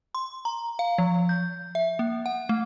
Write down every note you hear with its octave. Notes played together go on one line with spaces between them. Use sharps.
C6
A#5
F5
F3
G6
E5
A#3
F#5
A3